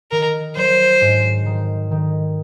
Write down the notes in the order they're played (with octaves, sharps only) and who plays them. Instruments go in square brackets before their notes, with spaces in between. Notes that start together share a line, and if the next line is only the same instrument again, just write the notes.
[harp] D#3 [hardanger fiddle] A#4
[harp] F#3 [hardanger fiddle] C5
[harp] G#2
D#3
D#3